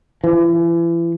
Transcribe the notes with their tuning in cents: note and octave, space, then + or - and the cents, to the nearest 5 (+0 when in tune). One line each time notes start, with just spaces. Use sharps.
E3 +35